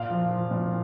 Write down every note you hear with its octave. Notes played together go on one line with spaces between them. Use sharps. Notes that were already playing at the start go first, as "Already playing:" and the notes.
Already playing: A#2 F5
F3
F3
A#2